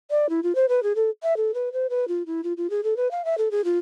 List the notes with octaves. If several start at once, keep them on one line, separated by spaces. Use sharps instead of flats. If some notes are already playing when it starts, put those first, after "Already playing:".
D5
E4
F4
C5
B4
G#4
A4
E5
A4
B4
C5
B4
F4
E4
F4
F4
G#4
A4
B4
F5
E5
A4
G#4
F4